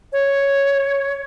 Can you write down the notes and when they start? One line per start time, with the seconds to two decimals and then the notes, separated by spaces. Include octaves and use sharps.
0.13 C#5